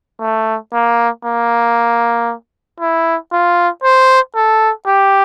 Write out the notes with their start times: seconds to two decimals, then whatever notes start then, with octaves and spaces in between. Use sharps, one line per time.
0.20 A3
0.73 A#3
1.24 A#3
2.80 E4
3.32 F4
3.84 C5
4.35 A4
4.87 G4